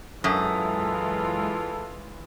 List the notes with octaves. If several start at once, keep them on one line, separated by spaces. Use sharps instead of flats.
F#2 E3 G#3 F4 A4 E5 D#6